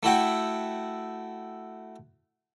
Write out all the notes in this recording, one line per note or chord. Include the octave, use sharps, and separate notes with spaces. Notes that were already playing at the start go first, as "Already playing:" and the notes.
A3 E4 F#4 G5